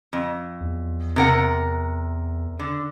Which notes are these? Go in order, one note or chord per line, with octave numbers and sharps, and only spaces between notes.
F2
E2
C3 A#4 F#5
D3